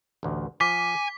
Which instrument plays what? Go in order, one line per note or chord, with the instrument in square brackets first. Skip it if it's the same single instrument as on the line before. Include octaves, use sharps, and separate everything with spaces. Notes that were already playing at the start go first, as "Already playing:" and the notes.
[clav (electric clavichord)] A1 D2
[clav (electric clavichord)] F3 [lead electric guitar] G#5 [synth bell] D6 [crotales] B6